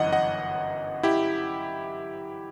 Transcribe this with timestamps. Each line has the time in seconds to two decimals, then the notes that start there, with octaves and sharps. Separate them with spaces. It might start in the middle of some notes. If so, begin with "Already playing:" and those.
Already playing: G1 F#2 E3 D#5 F#5
0.12 D#5 F#5
1.03 E4 G4